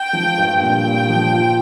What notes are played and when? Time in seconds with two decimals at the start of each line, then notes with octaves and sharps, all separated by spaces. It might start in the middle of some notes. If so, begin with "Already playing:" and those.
Already playing: G5
0.13 F3
0.38 G2
0.61 A#2 G5
0.85 A#2
1.09 F3
1.33 F4